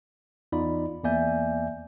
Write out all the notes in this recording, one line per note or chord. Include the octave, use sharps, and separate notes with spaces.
E2 D#4 F4 D5 B5
E2 A#3 D5 E5 G#5 G6